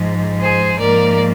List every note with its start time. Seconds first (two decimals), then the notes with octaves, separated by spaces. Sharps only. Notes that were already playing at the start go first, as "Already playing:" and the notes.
Already playing: G#2 F3 G#3
0.40 G#4 C5
0.78 G#2 F3 A#3 A#4 D5